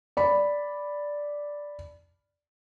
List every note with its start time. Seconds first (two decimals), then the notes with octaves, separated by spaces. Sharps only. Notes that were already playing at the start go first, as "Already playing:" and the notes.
0.17 D5 B5